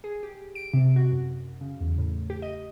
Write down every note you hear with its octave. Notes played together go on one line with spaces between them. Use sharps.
G#4
G4
D7
C3
F#4
F#2
C#3
E2
A2
G4
D#5